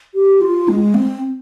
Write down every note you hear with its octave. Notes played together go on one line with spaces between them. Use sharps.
G4
F4
G#3
C4